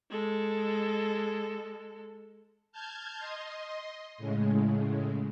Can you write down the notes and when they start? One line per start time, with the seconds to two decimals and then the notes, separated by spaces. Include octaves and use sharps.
0.11 G#3 A4
2.72 A5 F6 G6 G#6
3.18 D#5 C6
4.18 A2 C#3 G#3